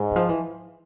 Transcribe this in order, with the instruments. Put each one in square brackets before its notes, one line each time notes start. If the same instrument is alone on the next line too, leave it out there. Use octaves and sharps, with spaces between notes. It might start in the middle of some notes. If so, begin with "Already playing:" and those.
Already playing: [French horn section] G#2
[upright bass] E3
F3
E3